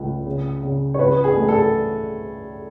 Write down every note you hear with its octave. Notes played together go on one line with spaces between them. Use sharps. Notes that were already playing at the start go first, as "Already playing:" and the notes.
Already playing: C#2 A3
C#3
C#3
C#5
C#2 B4
G#4
A3
A4